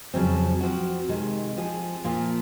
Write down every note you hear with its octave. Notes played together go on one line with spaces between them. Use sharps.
F2 C#3 F#3 C4
F3 C4 F#4
C3 D#3 G#3
F3 C4 F4 G#4
A#2 F3 A#3 F4